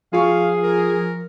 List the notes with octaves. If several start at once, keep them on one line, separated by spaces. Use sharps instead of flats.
F3 F4 G#4 F5 C#6
A#4